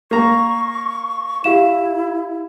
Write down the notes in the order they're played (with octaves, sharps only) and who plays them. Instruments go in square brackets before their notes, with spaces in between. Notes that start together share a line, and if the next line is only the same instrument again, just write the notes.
[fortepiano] A#3 A#5 [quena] C#6
[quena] E4 [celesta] G4 F5 E7